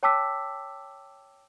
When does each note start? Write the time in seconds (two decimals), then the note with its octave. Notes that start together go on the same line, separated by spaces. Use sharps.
0.03 C#5 G5 A5 D6 E6 B6